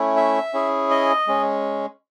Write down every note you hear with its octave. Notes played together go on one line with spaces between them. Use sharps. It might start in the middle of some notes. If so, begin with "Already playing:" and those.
Already playing: A3 C#4 E4
E5
C#4 E4 G#4
D#5
G#3 C#4